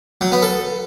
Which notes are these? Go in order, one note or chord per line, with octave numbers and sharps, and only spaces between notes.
F#3
B3
A4